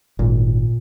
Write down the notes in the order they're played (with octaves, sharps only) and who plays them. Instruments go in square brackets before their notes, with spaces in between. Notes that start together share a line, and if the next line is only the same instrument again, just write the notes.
[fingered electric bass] G#1 [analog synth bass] A#2